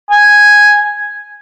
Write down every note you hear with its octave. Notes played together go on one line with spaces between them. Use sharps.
G#5